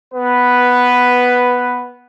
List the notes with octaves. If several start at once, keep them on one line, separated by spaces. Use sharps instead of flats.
B3 B4